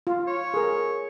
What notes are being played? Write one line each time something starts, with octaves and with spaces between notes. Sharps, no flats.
F4
C#5
G#4 A#4